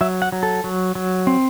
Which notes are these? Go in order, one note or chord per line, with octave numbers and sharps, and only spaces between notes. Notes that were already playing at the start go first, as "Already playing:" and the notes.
F#3 E5
F#5
F#3
A4
F#3
F#3
C4